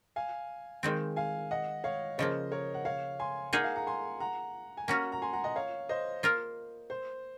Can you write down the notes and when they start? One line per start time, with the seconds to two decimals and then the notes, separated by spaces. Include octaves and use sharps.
0.16 F5 G#5
0.83 D#3 G#3 C4
1.16 F5 G#5
1.51 D#5 F#5
1.84 C#5 F5
2.18 C#3 F3 A#3 C5 D#5
2.52 A#4 C#5
2.74 F#5
2.85 C#5 F5
3.20 G#5 C6
3.53 A#3 D#4 G#4 F#5 A#5
3.64 F5 G#5
3.76 F#5 A#5
3.87 G#5 C6
4.20 F#5 A#5
4.77 G#5
4.88 A#3 C#4 F#4 F#5 A#5
5.12 A#5
5.22 G#5 C6
5.33 F#5 A#5
5.44 D#5 F#5
5.56 C#5 F5
5.89 C5 D#5
6.23 A#3 F4 A#4
6.90 C5